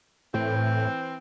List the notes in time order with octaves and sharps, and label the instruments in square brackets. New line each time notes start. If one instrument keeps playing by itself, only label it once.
[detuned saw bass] A2 [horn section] E3 C4